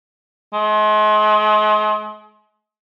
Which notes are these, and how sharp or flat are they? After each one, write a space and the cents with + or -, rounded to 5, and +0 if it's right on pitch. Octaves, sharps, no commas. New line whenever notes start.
G#3 +40